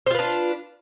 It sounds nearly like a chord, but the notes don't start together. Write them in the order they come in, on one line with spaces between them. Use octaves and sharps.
C5 F4 B4 D4